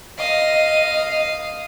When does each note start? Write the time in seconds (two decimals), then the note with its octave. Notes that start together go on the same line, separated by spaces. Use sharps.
0.19 D#5 F5 D#6